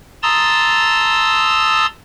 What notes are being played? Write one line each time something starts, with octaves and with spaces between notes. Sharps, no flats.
A5 A#5 C6 D#6 E6 A6